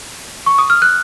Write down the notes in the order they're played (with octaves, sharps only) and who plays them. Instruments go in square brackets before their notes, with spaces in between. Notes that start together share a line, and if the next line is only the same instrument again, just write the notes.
[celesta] C#6
D#6
F6
F#6